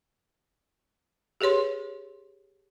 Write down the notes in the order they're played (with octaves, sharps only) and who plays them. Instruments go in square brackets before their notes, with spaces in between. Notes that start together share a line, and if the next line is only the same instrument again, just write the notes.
[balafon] G4 G#4 B4 C#5 C6